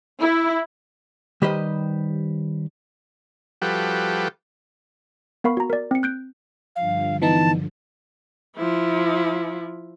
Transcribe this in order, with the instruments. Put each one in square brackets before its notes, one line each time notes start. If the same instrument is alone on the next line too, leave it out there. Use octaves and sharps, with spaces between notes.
[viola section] E4
[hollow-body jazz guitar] D#3 G3 G4 B4 C5 D#5
[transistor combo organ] F3 G3 F#4 G4 A4 B4
[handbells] B3 A#4 F5 B5 C#6
F#4 A#5
A#4 D5
C4 C#7
F#6 G6 D7
[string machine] G2 D3 F3 [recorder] F5
[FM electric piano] E3 B3 D#4 [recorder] A5
[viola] F3 E4